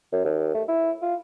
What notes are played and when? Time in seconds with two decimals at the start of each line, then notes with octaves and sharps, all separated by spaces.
0.12 F#2
0.25 D#2
0.54 A3
0.68 E4
1.02 F4